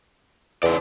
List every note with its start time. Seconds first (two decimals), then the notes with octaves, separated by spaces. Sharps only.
0.63 E2 C#3 D5